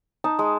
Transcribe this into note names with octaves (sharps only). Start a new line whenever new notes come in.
D#4 A5
G#3